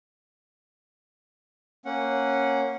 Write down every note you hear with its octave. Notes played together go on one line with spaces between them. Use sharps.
A#3 C#4 F#5